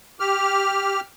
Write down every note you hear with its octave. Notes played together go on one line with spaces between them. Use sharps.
G4 F6